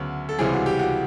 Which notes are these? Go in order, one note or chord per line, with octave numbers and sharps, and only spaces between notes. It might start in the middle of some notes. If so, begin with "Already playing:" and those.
Already playing: D2 C#3 F#3 B3
A4
C#2 C3 E3 G3 C4 G#4
F#4
G4
F#4